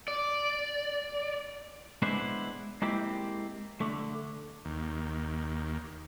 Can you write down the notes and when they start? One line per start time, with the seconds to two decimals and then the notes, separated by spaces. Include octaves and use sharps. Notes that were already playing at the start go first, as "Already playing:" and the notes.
0.08 D5
2.02 G#3 B3 D4 E4 B4 C5
2.82 G#3 A#3 C4 E4 G4
3.81 D3 A3
4.65 D#2